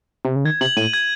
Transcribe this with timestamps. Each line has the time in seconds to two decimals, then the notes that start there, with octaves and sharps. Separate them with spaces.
0.25 C3
0.36 C#3
0.45 D#3 G#6
0.61 C3 F#7
0.77 A2 D#7
0.94 G#6